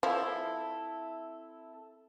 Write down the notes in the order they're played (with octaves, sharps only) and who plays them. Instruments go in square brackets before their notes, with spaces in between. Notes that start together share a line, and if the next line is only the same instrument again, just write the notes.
[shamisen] F3 [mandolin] C4 E4 A4